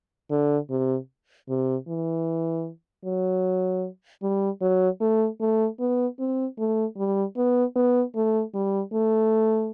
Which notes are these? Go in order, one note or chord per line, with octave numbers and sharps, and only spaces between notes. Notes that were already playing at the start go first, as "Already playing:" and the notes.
D3
C3
C3
E3
F#3
G3
F#3
A3
A3
B3
C4
A3
G3
B3
B3
A3
G3
A3